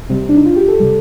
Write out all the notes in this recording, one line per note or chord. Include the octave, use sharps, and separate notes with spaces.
C3 G3 C4
D4
D#4
F4
G4
A4
C3 G3